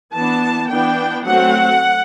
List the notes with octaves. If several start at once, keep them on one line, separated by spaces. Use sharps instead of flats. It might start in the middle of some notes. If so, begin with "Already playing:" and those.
E3 B3 D4 A5
E3 B3 D4 G5
F#3 A3 C4 F#5